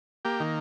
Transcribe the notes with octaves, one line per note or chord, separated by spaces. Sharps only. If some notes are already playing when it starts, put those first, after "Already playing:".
A#3 G4
D#3